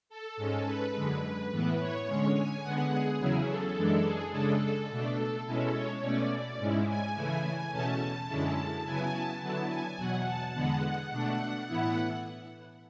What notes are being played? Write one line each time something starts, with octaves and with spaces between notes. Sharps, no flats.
A4
G#2 G#3 C#4
B4
F#2 D3 G#3
B4
A2 E3 B3 E4
C#5
D3 G#3 C#4
G#5
D3 G#3 B3 F#5
G#4
E2 C#3 F#3 C#4 E4
A4
F#2 E3 G#3 D4
G#4
C#3 G#3 D4 A4
B2 A3 D4 A4
B2 G#3 C#4 E4
C#5
B2 A3 C#4 D5
G#2 G#3 C#4 E4
G#5
C#3 E3 A3 E4
E2 B2 A3 C#4 A5
F#2 D3 G#3 C#4 E4 A5
C#3 F#3 B3 E4 G#5
A5
D3 F#3 B3 E4 A5
G#5
E2 B2 F#3 F#5
A5
E2 D3 G#3 B3 F#5
F#5
B2 A3 D4
A2 E3 B3 E4 F#5